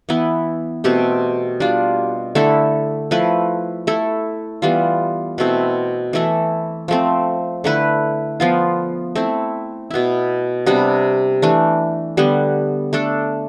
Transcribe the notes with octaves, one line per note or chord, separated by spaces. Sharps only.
E3 B3 E4
B2 A3 C4 G4
G3 D4 F4
D3 A3 E4 A4
F3 A3 E4 B4
A3 E4 A4
E3 G3 B3 F4
B2 A3 C4 E4
E3 A3 E4 A4
F3 A3 C4
D3 A3 E4 B4
F3 B3 F4
A3 C4 E4
B2 B3 E4
C3 G3 B3 D4
E3 A3 D4
D3 G3 B3
A3 D4 A4